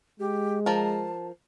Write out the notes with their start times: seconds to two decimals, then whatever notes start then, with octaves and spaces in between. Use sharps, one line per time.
0.20 G#3 G4
0.66 F3 A#4 A5